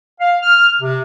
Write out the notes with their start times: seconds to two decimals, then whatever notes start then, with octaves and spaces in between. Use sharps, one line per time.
0.20 F5
0.42 F6
0.81 C3